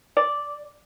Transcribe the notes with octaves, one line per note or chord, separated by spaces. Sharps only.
D5